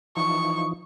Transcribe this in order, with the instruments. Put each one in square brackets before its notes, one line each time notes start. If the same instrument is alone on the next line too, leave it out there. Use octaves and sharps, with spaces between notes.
[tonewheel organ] E3 F3 D#4 [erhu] C#6